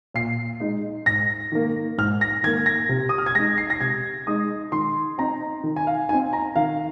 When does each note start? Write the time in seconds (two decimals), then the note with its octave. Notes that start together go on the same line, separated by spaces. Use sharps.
0.14 A#2 C7
0.60 G#3 D#4
1.06 G#2 A#6
1.52 D#3 A#3
1.98 G#2 F6
2.21 A#6
2.43 D#3 A#3 G#6
2.66 A#6
2.89 C3
3.09 D#6
3.18 F6
3.26 G#6
3.35 G#3 D#4 A#6
3.58 C7
3.70 A#6
3.81 C3 G#6
4.27 G#3 D#4 D#6
4.72 D#3 C6
5.18 C4 D#4 A#5
5.63 D#3
5.76 G#5
5.87 F5
6.09 C4 D#4 G#5
6.33 A#5
6.56 D#3 F5